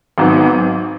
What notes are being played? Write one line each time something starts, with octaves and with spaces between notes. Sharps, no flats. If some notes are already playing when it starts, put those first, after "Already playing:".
G#1 G#2 F#3 B3 D#4